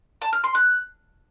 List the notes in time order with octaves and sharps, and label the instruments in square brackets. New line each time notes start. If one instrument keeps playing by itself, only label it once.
[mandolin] A5
F6
C6
F#6